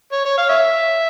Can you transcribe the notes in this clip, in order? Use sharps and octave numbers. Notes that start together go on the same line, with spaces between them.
C#5
C#5
F5
C#5 E5